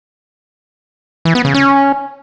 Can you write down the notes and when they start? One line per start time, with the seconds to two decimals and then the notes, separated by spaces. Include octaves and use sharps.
1.25 E3
1.35 B3
1.45 C#3
1.54 C#4